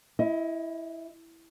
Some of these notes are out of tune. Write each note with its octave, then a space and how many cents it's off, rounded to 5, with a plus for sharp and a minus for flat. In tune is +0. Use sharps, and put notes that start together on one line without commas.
E4 +0 D#5 +30